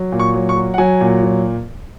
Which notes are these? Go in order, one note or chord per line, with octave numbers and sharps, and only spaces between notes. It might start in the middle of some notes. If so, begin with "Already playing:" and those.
Already playing: F#3
A#2
C#6
F#3
C#6
F#3
F#5
F#3 G#5
A#2
F#3